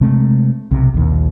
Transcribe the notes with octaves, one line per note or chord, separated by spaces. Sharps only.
C3 G#3 A3 C4
B1 C3
A#1 D#2